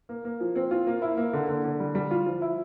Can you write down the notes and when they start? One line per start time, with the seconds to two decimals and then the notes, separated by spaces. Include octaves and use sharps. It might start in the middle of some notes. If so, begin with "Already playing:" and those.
0.09 A#3
0.25 A#3
0.40 F3
0.55 C4
0.71 F4
0.87 A#3
1.02 E4
1.17 A#3
1.33 D3
1.48 D3
1.64 D3
1.80 G3
1.95 G3
2.11 F4
2.26 F3
2.42 E4